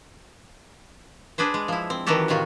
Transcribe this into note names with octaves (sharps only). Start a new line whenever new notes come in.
D4 G#4 B4 C5
G#3
F3 E4
C4
D#3 E3 F#3 F#4 G4 A4
A2 C3 D#3 F4 F#4